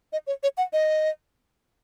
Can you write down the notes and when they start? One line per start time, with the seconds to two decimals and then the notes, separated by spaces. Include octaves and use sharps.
0.13 D#5
0.27 C#5
0.43 C#5
0.57 F#5
0.73 D#5